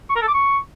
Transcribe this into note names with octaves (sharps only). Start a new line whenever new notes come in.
C#6
A#4
A4
D6
C#6